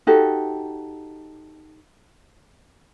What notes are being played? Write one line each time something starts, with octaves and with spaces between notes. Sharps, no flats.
D#4 F#4 G4 A4